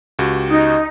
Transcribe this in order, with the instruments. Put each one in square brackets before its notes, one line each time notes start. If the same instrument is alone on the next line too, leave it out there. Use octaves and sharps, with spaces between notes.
[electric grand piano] C#2 F#4 G4
[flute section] D#4